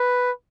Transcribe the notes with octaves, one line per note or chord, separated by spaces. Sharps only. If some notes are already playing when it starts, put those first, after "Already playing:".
Already playing: B4